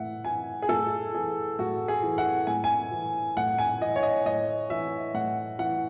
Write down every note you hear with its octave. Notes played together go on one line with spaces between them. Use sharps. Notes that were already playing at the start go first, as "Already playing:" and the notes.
Already playing: A2 E3 E5 F#5
E3 G#5
G#4
A2 A4
E3 G#4
A2 F#4
G#4
E3
F#5
A2 G#5
G#5
E3
A2 F#5
G#5
E3 D#5
C#5
D#5
A2 D#5
E3 E5
A2 F#5
E3 F#5